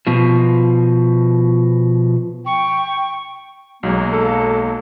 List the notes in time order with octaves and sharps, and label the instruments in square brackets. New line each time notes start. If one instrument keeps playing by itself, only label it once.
[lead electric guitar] B2 F3
[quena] G5 [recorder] C#6
[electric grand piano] B1 F#3 G#3 [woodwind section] A#3
[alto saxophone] A4